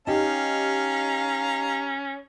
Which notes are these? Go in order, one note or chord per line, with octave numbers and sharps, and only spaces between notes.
C#4 D#4 G4 F5 A#5